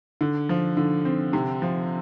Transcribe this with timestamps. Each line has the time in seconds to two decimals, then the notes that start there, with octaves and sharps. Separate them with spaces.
0.21 D3
0.49 F3
0.77 D3
1.05 C4
1.33 C3
1.62 F3